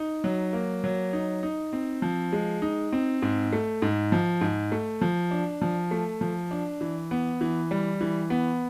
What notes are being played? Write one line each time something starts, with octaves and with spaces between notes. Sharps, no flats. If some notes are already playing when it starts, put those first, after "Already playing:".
Already playing: D#4
F#3
A#3
F#3
D#4
D#4
C4
F3
G#3
D#4
C4
G#2
A3
G#2
F3
G#2
A3
F3
D4
F3
A3
F3
D4
E3
B3
E3
G3
E3
B3